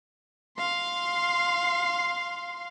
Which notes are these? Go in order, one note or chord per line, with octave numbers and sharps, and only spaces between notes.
F5 C6